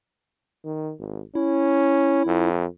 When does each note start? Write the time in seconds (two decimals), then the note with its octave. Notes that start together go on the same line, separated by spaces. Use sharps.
0.65 D#3
0.99 G#1
1.35 C#4 E4
2.26 F2